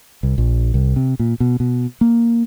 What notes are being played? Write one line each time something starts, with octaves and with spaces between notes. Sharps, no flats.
C2
A#1
C2
C3
A#2
B2
B2
A#3